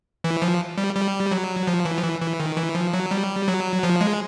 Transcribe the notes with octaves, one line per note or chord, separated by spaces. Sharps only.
E3
F3
G3
G3
F#3
F3
E3
F3
E3
E3
D#3
E3
F3
F#3
G3
F#3
F3
G#3